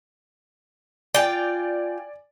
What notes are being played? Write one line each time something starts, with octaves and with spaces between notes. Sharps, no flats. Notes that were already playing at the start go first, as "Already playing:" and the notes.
F4 D5 G5 G#5